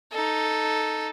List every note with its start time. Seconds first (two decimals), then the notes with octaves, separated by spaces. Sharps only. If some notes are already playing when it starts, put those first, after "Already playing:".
0.12 D#4 A4